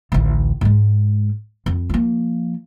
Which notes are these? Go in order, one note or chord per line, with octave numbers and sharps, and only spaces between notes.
A1 D2
G#2 G#3
F2
F3 A#3